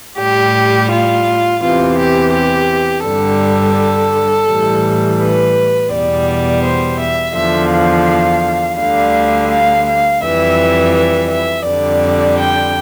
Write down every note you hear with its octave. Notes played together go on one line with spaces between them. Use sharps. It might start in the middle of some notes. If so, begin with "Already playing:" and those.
A2 G3 G4
F4
E2 C3 E3 F4
G4
G4
G2 D3 G3 A4
A2 E3 G3
B4
E2 B2 G3 D5
C5
E5
E2 D3 F3 E5
F5
D2 D3 G3 F5
F5
F5
F2 E3 G3 E5
E5
E5
F2 D3 G3 D5
G5